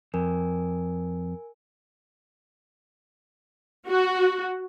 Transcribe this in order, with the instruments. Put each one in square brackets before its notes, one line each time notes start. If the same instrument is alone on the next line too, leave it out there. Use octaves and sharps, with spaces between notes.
[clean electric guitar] F2 [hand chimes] A#4 G#5
[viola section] F#4